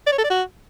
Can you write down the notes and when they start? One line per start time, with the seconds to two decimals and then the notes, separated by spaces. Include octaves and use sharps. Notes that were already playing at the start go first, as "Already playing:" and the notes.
0.07 D5
0.12 C#5
0.18 A4
0.24 D5
0.30 F#4